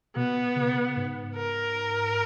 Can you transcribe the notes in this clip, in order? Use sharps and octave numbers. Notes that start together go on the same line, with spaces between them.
B2 B3
C#3
G#2
A#4